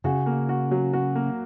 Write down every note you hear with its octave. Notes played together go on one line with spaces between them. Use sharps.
C#3 F#4
A#3
F#4
F#3
F#4
A#3